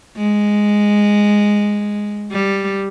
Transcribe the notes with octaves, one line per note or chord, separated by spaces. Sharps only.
G#3
G3